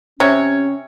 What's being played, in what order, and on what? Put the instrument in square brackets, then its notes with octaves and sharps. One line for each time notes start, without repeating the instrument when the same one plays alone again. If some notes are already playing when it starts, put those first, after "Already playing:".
[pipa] C3 [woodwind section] C#4 [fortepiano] C#5